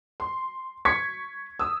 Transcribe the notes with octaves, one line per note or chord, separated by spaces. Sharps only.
C6
C#6 G#6 B6 C#7
D#6 E6